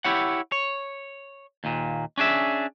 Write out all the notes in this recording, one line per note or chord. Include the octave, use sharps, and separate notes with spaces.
E4 G4 C#5 F#5
C#5
D#2 A#2
C#4 D4 G#4 E5